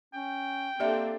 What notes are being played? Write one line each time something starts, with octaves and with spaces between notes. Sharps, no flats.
C#4 G5
A#3 C4 D4 G4 A4 D5 E5